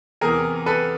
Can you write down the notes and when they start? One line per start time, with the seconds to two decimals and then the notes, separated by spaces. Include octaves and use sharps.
0.21 E2 C3 E3 G#4 A#4
0.66 A4 B4